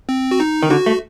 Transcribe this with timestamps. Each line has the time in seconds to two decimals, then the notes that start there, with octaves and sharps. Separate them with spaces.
0.09 C4
0.31 F#4
0.40 D#4
0.63 D#3
0.70 D3 F#4
0.86 A3